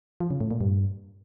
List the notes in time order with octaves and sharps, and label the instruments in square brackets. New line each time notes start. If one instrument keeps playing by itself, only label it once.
[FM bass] F3
C#3
A2
A#2
G2